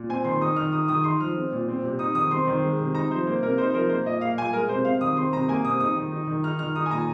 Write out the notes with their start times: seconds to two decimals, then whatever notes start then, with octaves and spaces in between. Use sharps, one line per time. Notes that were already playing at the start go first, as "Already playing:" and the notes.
Already playing: A#2
0.09 C4 G#5
0.25 D#3 C6
0.41 D#4 D#6
0.56 D#3 F6
0.72 D#4 D#6
0.88 D#3 D#6
1.04 D#4 C6
1.21 F3 F6
1.36 C4
1.52 A#2
1.68 C4
1.84 C3
1.99 D#4 D#6
2.15 D#3 D#6
2.31 C4 C6
2.47 D#3
2.63 G#3
2.79 C3
2.95 D#4 A#5
3.10 F3 C5
3.27 A#3 C5
3.42 C3 A#4
3.58 D#4 C5
3.70 C5
3.74 F3 A#4
3.89 A#3 C5
4.05 A#2 D#5
4.21 A#3 F5
4.37 A#2 G#5
4.53 G#3 A#4
4.69 C3 C5
4.85 C4 F5
5.01 D#3 D#6
5.17 C4 C6
5.33 C3 A#5
5.48 A#3 G#5
5.65 C3 D#6
5.80 D#4 D#6
5.96 D#3
6.11 D#4
6.27 D#3
6.43 D#4 F6
6.59 D#3 F6
6.75 D#4 D#6
6.86 G#5
6.91 A#2 A#5